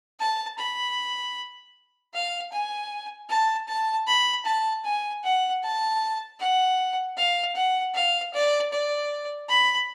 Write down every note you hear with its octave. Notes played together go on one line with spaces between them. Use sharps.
A5
B5
F5
G#5
A5
A5
B5
A5
G#5
F#5
A5
F#5
F5
F#5
F5
D5
D5
B5